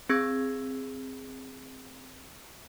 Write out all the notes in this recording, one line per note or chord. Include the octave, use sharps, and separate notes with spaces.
C4 G#4 E6 G#6 A#6